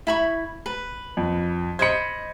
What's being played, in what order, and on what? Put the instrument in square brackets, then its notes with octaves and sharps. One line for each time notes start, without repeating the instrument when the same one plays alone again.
[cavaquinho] E4 B5 C#6
B4
[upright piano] F2
[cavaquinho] C5 D#5 B5 [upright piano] G#6 C#7